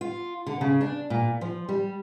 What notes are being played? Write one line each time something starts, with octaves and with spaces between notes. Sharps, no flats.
F4
D3
C#3
D4
A#2
F3
G3